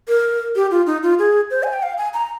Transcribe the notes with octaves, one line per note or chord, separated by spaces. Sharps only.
A#4
G4
F4
D#4
F4
G#4
C5
G#5
G5
F5
G#5
A#5